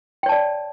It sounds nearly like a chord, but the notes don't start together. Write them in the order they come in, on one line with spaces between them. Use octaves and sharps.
G5 C#5 A5 D5